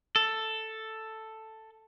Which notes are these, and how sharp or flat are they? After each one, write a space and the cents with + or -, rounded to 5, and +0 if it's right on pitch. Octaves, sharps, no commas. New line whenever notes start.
A4 +5